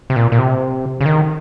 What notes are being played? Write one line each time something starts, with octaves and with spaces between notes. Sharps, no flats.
C3
A#2
A#2
C3
C#3
D#3